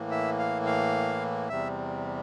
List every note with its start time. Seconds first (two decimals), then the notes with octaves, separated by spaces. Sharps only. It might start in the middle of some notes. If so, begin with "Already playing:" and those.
Already playing: A2 E3 A#3
0.11 E5
0.39 F5
0.66 F5
1.49 E2 C3 G3 E5